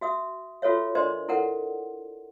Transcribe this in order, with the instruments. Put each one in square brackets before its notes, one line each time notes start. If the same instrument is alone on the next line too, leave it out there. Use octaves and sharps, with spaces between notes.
[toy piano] F#4 E5 D#6
F4 F#4 A4 C5 C#5 E5
D4 A#4 C5 D5 D#5 C6
E4 A4 A#4 F#5